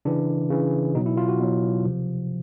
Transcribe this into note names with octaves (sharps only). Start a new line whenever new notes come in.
C#3 E3 D4
C#3 E3
B2 F#3 D#4
E4
F4
F#4
B2 F#3
C3 F3